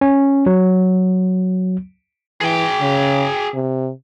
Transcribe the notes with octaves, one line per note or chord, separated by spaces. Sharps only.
C#4
F#3
E3 G#4 G5
C#3
C3